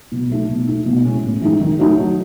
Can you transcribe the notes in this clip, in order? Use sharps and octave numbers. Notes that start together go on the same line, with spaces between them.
B2
F#3 A3 D#4
B2
A3 D#4
B2
G#3 C#4 E4
A2
E3 G#3 D#4
D#3
F#3 A3 D#4
F#3